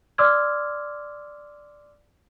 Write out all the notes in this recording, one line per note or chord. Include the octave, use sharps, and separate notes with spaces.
D5 C6 D6 E6 F6 G#6